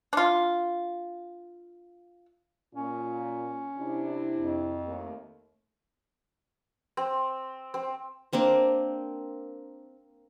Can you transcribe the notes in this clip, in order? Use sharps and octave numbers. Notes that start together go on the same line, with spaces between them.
D4 F4
A#2 C#4
C3 D4 E4
F2
D#2 A3
C4
C4
A#3 C4 D4 A#4